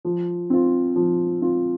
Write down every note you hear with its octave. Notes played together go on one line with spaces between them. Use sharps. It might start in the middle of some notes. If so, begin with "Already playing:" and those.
F3
C4 F4
F3
C4 F4